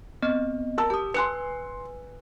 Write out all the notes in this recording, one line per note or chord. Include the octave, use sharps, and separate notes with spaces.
B3 C4 D#5
A#4 A5 E6
G4 A5 D#6
B4 G#5 C6 F#6 C#7